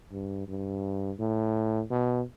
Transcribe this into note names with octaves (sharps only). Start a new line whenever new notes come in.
G2
G2
A2
B2